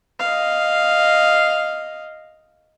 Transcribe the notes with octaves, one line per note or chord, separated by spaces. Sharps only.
D#5 F5